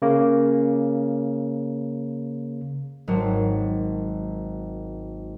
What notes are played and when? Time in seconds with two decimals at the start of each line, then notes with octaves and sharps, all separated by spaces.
0.02 C#3 A#3
3.08 G#1 F#3